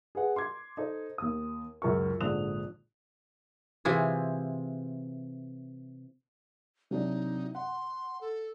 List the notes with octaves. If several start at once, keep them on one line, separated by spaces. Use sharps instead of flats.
G#4 B4 F#5
C6 D6 G#6
D#4 A4 C5 D#5
D#2 D#6
C#2 F#2 A#4 C#6
A#1 G#2 D3 D#6 F#6 F7
C3 E3 F4 G#4
C3 F#3 D4 D#4
F#5 C6
A4